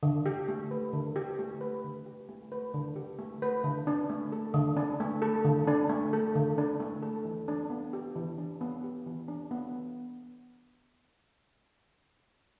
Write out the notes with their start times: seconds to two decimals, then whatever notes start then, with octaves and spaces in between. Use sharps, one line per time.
0.03 D3
0.26 G4
0.48 A3
0.71 B4
0.93 D3
1.16 G4
1.39 A3
1.61 B4
1.84 D3
2.06 G4
2.29 A3
2.52 B4
2.74 D3
2.96 G4
3.19 A3
3.42 B4
3.64 D3
3.87 D4
4.10 A3
4.32 A4
4.54 D3
4.77 D4
5.00 A3
5.22 A4
5.45 D3
5.67 D4
5.89 A3
6.13 A4
6.35 D3
6.58 D4
6.80 A3
7.03 A4
7.25 E3
7.48 D4
7.70 B3
7.93 G4
8.16 E3
8.38 D4
8.61 B3
8.84 G4
9.06 E3
9.28 D4
9.51 B3